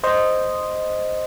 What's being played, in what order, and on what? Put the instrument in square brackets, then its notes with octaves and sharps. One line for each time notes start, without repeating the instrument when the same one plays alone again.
[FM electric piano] C5 D#5